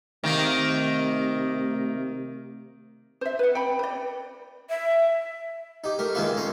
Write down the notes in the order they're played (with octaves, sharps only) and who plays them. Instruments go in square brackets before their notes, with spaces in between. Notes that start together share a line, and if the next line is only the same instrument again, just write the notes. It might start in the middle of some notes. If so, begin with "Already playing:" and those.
[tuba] C3 [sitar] D#3 A#3 [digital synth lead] A3
[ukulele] C5 E5
B4 F#5
G5 B5
B4 D5
[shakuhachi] E5
[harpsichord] D#4 G4
A3 G4 A#4
D#3 G#3 A#3 E4 F4 B4
A2 C#4 A#5 C6